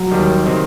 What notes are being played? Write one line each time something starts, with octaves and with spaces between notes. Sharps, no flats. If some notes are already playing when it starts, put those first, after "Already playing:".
Already playing: F#3
D#2 D#3 G3
C3 D#3